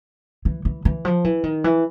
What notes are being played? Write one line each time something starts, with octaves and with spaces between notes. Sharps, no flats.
E3
E3
E3
F3
E3
D#3
E3